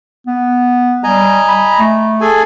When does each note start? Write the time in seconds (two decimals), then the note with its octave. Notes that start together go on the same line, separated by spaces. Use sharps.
0.27 B3
1.04 G3 D#5 G#5 A#5
1.48 B5
1.79 A3
2.21 G#4 A4 G#5